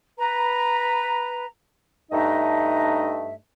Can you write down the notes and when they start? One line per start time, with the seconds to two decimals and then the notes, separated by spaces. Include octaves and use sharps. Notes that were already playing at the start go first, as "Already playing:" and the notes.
0.18 B4 A#5
2.12 G2 A3 D4 D#4 D#5 E5